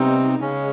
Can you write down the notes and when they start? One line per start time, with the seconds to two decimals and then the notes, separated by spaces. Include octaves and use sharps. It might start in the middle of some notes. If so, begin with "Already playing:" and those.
Already playing: C3 G3 B3 C4 D#4
0.41 C#3 G#3 C#4